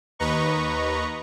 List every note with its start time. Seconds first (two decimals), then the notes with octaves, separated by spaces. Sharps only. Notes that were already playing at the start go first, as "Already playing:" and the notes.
0.19 D#2 B4 D#5 A#5 C#6